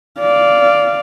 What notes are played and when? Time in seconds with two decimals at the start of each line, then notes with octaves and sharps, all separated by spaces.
0.20 D5 F5